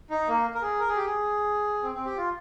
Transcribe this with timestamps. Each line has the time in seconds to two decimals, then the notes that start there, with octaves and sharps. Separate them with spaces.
0.10 D#4
0.28 A#3
0.55 A#4
0.62 G#4
0.80 A#4
0.88 G#4
0.96 G4
1.05 G#4
1.83 C4
1.94 C4
2.05 G4
2.17 F4